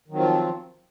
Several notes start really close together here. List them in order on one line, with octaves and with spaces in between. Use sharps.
D#3 F#3 C4 F4 F3